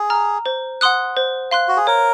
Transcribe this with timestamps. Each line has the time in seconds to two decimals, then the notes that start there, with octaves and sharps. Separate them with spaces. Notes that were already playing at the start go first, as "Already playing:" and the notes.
Already playing: G#4
0.10 A#5 F6
0.46 C5
0.81 F#5 C6 D#6 F#6
1.17 C5
1.51 F5 C6 F#6
1.68 F#4
1.77 G#4
1.87 A#4 C#5